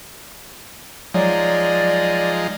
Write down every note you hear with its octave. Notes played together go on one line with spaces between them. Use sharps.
F3 F#3 G#3 D#4 D5